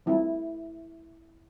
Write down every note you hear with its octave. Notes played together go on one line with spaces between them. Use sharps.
E3 G3 C4 E4 F4